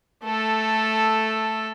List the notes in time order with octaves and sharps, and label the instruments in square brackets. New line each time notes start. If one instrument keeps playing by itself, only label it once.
[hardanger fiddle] A3 A4